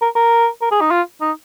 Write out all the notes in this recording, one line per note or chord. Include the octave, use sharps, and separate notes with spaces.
A#4
A#4
A#4
G#4
D#4
F4
D#4